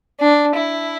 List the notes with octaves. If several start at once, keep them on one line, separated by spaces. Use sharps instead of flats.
D4
E4